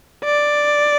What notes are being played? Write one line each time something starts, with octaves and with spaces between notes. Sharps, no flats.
D5